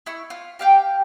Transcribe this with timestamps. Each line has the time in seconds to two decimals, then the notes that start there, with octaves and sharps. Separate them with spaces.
0.06 E4 C#6
0.30 F4
0.59 G4 F5 G5